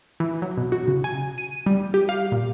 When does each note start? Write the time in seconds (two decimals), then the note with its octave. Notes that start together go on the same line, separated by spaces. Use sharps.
0.20 E3
0.42 F#3
0.58 B2
0.72 F#4
0.88 C#3
1.04 G#5
1.38 D#7
1.66 G3
1.94 G4
2.09 F5
2.32 A#2